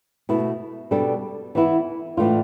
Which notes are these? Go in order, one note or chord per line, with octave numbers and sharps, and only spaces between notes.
B2 A3 E4
B2 G3 D4 A4
E3 B3 E4
A2 E3 A3 D4 F4